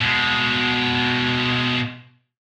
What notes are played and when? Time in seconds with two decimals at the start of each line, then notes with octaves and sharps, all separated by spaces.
0.02 B2 G#3